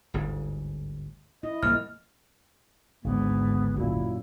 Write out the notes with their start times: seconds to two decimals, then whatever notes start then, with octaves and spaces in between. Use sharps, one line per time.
0.14 G1 D2 G#2
1.43 E4 D#5
1.63 C2 G#2 F3 A#3 F6
3.04 G#1 D2 G#2 D3 B3
3.77 F#2 A#2 E4